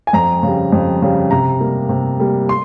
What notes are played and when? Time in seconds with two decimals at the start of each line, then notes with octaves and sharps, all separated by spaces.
0.07 G#5
0.13 F2 A#5
0.43 C#3 G3
0.72 F2
1.02 C#3 G3
1.31 C3 A#5
1.60 G3 A#3
1.89 C3
2.20 G3 A#3
2.49 C6